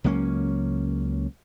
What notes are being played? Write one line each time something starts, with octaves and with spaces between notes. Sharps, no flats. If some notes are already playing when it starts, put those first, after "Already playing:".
C#2 F#3 A#3 C#4